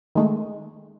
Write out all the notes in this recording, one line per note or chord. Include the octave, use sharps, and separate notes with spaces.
D#3 G#3 A3